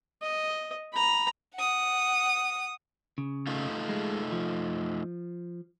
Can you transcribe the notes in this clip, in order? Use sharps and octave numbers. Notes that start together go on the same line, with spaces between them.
D#5
A#5 B5
F#5 D#6
C#3
A3 D#4 F4
G#3
F3